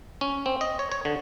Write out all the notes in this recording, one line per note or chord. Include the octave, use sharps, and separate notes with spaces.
C#4
C4
D#5
C#5
C#5
D3